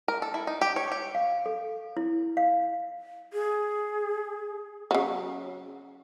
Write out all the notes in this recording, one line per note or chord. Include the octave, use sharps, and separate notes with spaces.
A#4
A4
E4
D#4
G4
C#5
G4
F5
A4
E4
F5
G#4
C#3 F#3